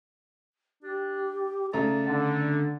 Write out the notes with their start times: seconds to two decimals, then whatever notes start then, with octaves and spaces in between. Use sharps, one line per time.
0.83 D4 G4
1.73 C#3 A3 D5 A5 A#5
2.06 D3 A5